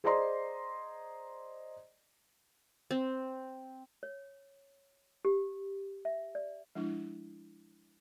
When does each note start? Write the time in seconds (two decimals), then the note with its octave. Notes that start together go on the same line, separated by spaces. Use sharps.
0.04 G#4 C5 D5 D#5 A#5 C6
2.91 C4
4.03 C#5
5.25 G4
6.05 E5
6.35 D5
6.75 F3 G#3 D4 E4